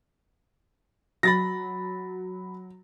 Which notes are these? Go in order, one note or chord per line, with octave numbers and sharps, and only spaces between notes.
F#3 B5 A6 A#6